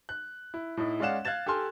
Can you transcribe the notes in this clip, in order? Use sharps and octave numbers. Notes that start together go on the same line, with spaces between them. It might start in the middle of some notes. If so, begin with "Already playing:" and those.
F#6
E4
A2 D#4 E4
G#3 C#4 D5 F5 F#5 E7
F5 F#6 G#6 A6 E7
G4 A4 G#5 C6 F6